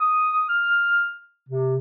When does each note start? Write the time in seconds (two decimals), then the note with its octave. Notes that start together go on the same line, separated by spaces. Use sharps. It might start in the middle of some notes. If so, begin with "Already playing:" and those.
0.01 D#6
0.49 F6
1.49 C3